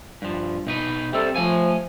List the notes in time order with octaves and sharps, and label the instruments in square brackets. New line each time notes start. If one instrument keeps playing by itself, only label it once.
[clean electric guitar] G2 F3
B2 D#4 B4
[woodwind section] C3 A4 [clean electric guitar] G3 C4
[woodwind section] F3 [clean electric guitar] A3 C#5 G#5